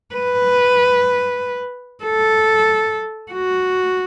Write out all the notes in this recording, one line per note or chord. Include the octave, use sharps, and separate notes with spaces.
B4
A4
F#4